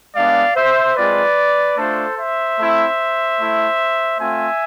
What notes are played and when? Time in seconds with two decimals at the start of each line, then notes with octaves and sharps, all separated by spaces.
0.15 G#3 B3 D4 D5 F5
0.56 C5 E5
0.96 G#3 C4 F4 B4 D5
1.78 A3 D4 F4 A4 C5
2.17 C5 E5
2.58 A3 C4 E4
3.40 A3 E4
4.20 A3 C4 F4 E5 G#5